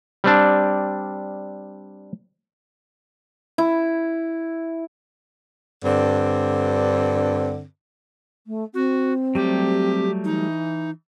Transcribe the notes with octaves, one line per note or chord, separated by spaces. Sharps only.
G3 C4 D4
E4
G2 D3 C4
A3
C4 F#4
F#3 G3 A3 G4
E3 D#4